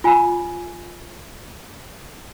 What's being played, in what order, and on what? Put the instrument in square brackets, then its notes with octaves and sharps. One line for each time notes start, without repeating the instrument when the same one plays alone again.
[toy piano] F4 G#5 B5